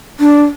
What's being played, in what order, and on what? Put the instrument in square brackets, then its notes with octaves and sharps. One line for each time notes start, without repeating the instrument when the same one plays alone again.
[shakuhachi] D4